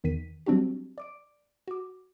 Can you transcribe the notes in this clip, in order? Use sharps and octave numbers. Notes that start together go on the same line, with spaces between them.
E2 D#3 B6 D#7
F#3 G3 C4 D4 F#4 G4
D5 D6 D7
F#4 D6